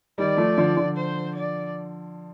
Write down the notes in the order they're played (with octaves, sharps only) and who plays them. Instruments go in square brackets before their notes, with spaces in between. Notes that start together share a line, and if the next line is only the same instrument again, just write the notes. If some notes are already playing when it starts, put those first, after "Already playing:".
[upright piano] D#3 G3 [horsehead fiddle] D5
[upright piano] F3 A3
D3 F3
D3 F3
[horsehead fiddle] C5
D5